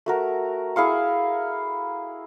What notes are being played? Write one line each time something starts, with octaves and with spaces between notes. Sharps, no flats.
A3 F#4 A#4
E4 G#4 F5 C#6